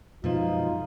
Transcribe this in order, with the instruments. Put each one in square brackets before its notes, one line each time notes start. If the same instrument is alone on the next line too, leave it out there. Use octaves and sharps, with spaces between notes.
[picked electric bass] F#2 B2 F3 [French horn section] G#3 D#4 F4